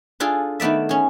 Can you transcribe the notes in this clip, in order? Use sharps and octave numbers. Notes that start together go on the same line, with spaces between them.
D4 F4 G#4 A4 D5
D#3 A3 B3 D5 E5
C#4 G#4